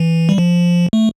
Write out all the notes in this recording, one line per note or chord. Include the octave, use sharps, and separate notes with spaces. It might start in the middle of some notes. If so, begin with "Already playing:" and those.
Already playing: E3
G3
F3
A3